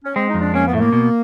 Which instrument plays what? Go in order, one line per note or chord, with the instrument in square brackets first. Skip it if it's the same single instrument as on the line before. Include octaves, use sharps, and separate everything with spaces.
[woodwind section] C#4
[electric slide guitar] G#3 [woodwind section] C4
[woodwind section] D#4
[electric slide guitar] F2
[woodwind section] D4
[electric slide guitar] A#3 [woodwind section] C#4
[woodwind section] B3
[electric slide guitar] A2 [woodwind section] A3
[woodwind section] A#3
[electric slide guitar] B2